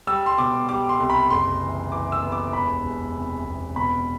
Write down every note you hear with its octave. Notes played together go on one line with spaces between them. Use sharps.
G3 E6
C6
B2 D6
G3 D6
C6
C2
B5
F#1 C6
E3
E3 D6
E6
B3
D6
E1 B5
E1
C3
E1
B2 B5